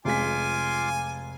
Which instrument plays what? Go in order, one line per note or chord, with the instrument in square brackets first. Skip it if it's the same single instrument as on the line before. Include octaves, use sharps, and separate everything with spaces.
[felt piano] F1 G#3 B6 [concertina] F4 C6 D6 [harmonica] G#5